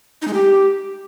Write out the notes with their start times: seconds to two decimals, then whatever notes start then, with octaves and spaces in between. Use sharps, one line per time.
0.22 D#4
0.28 G#3
0.34 G4